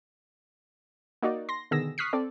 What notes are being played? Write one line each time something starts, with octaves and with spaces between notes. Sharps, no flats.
A#3 D#4 F#4 D5
C6 A#6
B2 D3 D#3 G#4 E6 A#6
C#6 D#6 F6 F#6 B6 C7
C4 A4 D5